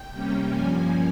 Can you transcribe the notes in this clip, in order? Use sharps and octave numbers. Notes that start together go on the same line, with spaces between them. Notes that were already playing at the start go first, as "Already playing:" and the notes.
Already playing: G5
C3 G3 A#3 C#4
G2 F3 A#3 C#4 G#5